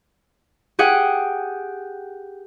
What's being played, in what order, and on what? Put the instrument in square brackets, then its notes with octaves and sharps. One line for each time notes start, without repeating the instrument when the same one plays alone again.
[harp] G4 G#4 F#5 G5